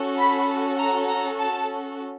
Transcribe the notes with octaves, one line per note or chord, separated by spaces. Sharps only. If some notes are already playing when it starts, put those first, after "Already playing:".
Already playing: C#4 F#4 A4
B5
A#5
A#5
A5